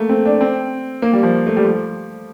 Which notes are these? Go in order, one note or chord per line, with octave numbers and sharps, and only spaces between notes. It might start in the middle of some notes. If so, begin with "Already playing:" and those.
Already playing: A3 A#3
C4
D4
C4
A#3
G3
F3
A3
G3
F3